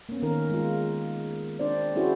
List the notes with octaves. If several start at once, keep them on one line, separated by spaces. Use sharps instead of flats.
A#3 B3 C#4
D#3 C#4 A#4
G#3 F4
C4 D4 C5 D5
C#4 E4 F#4 G#4 C5